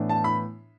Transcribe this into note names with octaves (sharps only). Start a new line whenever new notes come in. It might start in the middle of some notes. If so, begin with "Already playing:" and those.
Already playing: A2 E3 B3 D4
A5
B5